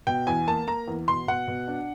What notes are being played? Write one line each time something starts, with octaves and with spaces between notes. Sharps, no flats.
B2 G5
E2 G#5
A#3 A5
A#3 A#5
E2
B2 C6
B2 F#5
B2
D4